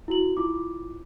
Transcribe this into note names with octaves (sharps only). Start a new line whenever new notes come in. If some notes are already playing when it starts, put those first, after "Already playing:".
E4 F#4 F#7
E4 F4 D6